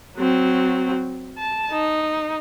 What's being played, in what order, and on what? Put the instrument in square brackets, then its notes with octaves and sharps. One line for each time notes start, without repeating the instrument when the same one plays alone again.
[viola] F#3 C4
A5
D#4